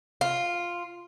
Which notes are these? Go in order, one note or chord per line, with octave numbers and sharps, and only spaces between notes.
F4